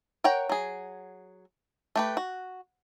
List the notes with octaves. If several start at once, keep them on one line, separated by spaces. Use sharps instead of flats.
A#4 C#5 F#5 G5
F#3 G#4
A3 G4 B4
F#4